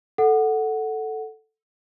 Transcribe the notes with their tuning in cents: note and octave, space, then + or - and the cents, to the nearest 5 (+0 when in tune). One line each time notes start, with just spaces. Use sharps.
A4 +0 F#5 +0